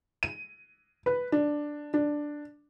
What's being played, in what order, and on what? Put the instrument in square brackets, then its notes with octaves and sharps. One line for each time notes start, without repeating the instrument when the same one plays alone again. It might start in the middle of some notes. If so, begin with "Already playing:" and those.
[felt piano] D#7
B4
D4
D4